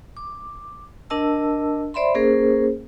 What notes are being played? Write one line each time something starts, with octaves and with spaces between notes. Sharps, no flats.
D6
D4 A#4 D#5 A5 E6
C5 D5 E5 B5 C6
A#3 C#4 G#4 A#4 C5